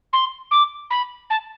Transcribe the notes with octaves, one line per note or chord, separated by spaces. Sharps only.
C6
D6
B5
A5